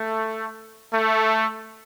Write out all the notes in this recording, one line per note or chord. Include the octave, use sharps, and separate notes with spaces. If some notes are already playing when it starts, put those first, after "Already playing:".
Already playing: A3
A3